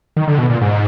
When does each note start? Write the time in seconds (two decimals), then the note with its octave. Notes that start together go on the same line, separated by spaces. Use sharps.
0.17 D#3
0.28 D3
0.38 B2
0.50 A#2
0.61 G#2